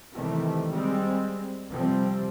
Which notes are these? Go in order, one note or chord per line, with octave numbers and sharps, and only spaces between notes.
C3 D#3 E3 G3 A3
G3 G#3 C4
C3 F3 G3 C4